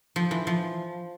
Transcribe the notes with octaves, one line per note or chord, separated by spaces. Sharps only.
F3
E3
F3